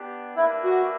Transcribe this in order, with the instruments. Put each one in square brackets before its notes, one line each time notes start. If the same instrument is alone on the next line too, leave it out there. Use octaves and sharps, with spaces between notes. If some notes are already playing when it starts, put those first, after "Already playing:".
Already playing: [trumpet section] B3 D4 G4
[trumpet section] A#3 D4 G4 B4 E5 [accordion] E4
[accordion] F#4